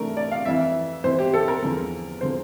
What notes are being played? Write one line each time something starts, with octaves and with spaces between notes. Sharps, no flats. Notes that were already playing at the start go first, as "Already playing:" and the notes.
Already playing: C3 E3 A3 D4 A#4
D5
F5
F2 C3 E3 E5
F2 C3 E3 C5
G4
A4
A#4
E2 D3 F3
D3 F3 C5